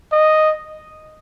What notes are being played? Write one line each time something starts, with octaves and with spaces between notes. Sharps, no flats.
D#5